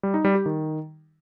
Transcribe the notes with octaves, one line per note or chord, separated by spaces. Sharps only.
G3
D#4
G3
G4
D#3